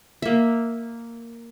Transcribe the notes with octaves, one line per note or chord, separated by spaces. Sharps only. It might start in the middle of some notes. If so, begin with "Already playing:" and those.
A#3 E5